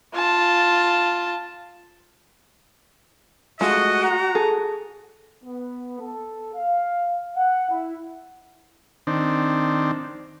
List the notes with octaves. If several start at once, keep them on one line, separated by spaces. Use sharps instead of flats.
F4 A5
G#3 A3 F4 F#4 D#5
A#5
G#4 A4
B3
A4
F5
F#5
E4
D#3 C4 D4